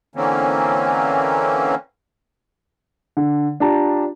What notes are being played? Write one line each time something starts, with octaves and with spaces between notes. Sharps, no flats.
D3 E3 A#3 C4 C#4
D3
D4 F4 G4 A5 A#5